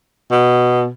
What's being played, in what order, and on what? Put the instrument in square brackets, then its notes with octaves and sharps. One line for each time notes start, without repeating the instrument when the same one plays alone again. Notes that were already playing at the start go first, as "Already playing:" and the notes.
[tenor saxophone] B2